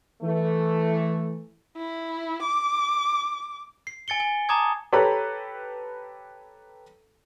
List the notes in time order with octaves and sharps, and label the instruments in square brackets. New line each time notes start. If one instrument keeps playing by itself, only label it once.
[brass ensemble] E3 A3
[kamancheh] E4
D6
[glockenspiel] C7
G#5 A6 C#7 G7
G#5
A5 A#5 D6 D#6 G#6
[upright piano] G4 A4 B4 C#5 A#5 B5